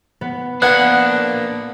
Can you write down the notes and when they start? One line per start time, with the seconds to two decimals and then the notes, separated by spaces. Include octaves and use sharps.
0.21 B3
0.62 A#3 B3 D4 F#5 F#6 G#6